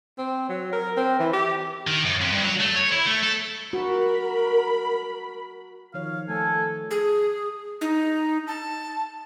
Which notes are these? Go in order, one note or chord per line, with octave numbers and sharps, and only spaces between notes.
C4
F#3
A#4
C4
E3
G4
D#3
F#2
F2
G2
F#3
A3
C#5
E4
A3
A4
F#4 A#4 B5
D#3 F3 C#5 F5
A3 A4 G#5
G#4
D#4
A5